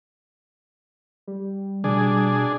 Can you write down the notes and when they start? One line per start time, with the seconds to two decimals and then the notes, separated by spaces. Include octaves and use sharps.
1.27 G3
1.84 B2 D4 G#4